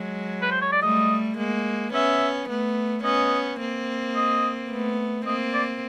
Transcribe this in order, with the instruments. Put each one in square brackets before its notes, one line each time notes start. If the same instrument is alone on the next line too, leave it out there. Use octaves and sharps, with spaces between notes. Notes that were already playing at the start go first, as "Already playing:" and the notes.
Already playing: [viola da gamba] F#3 G#3
[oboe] B4
C5
C#5
D5
[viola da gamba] G3 A3 [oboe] D#5
[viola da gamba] G#3 A#3
[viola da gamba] B3 C#4 [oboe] E5
[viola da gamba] A3 B3
[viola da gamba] B3 C#4 [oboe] D#5
[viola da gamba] A#3 C4
[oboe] D#5
[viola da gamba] A3 B3
[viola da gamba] A#3 C4 [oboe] D#5
[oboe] D5